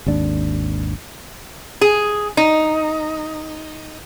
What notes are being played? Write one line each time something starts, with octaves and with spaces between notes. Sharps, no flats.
G#1 D#2 D4
G#4
D#4